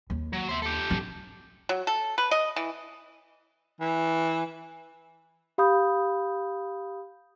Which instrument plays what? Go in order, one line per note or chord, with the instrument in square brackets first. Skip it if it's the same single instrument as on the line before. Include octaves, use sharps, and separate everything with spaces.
[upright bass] D#2
[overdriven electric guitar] F#3
C5 E5
G4 A4
[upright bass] D4
[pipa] F#3
A4
B4
D#5
E3
[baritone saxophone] E3
[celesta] G4 F5 B5 D#6 G6